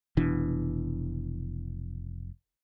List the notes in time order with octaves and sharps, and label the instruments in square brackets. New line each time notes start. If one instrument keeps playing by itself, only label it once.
[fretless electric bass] F1 B2 E3 D4